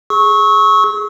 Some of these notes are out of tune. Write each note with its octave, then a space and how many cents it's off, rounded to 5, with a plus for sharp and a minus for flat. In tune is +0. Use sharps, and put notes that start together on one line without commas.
G#4 +0 C#6 -10 E6 -40